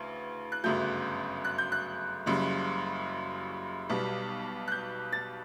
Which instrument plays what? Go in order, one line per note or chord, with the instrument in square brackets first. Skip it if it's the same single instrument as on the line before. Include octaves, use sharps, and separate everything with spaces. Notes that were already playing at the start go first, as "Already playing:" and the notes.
Already playing: [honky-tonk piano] D2 C#3 E3
F#6
G1 F#2 C#3 F#3 A3 G6
F#6
G6
F#6
F#1 F#2 C#3 G3
B1 B2 G3
F#6
G6
A6